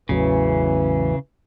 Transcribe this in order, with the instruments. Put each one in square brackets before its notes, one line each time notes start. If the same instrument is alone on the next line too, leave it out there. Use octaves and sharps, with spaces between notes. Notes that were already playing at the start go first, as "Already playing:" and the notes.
[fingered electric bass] A1 E2 F#3 [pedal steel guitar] C#3 [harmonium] E3